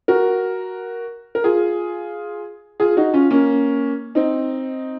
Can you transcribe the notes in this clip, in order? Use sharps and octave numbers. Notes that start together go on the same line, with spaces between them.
F#4 A#4
A#4
F4 G#4
F4 G#4
D#4 F#4
C#4 F4
A#3 C#4
C4 D#4